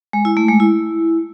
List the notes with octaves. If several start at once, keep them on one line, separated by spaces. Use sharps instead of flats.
G#3
E4
A3
G#3
E4